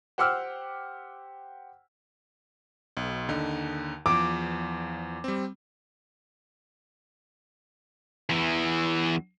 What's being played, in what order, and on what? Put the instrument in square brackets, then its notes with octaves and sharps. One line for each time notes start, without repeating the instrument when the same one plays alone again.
[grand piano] G4 C5 F#5 D6 E6 F6
[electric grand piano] B1
D#2 D3 D#4
[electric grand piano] E2 F3 [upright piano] D6
[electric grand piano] G3 C4
[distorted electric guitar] E2 E3